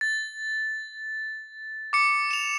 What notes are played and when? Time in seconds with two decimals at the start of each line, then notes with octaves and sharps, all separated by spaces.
0.01 A6
1.93 D6 C#7
2.31 E7 F7